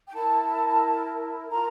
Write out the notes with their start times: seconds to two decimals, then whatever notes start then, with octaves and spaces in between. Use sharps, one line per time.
0.06 G5
0.12 E4 A#4 A5
1.50 F4 A#4 A#5